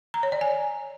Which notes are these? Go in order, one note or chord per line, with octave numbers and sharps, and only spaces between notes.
A#5
C#5
D5
G#5